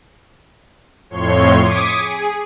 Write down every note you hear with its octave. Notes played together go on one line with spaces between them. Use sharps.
F2 A2 C#5 C6
D6 D#6 G#6 B6 C#7 D#7
G#4